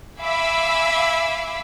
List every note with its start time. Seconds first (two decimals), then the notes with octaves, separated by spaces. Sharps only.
0.21 E5 F5 G#5 B5 D6 E6